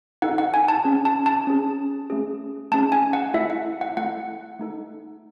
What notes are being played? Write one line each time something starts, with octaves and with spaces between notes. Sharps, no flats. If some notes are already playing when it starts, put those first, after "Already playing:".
D#4 A4 F#5
F#5
G#5
A5
C#4 G#4
A5
A5
C#4 G#4
A3 C#4 G#4
A3 C#4 G#4 A5
G#5
F#5
A3 E4 A4 E5
F#5
F#5
A3 E4 A4 F#5
A3 D#4 A4